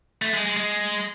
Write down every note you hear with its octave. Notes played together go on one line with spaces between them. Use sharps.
A3
G#3
G#3
G#3